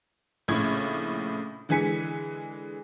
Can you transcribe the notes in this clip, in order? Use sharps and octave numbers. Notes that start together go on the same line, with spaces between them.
A#1 A2 C#3 G#6
D3 E3 G#3 G#5 B6 C#7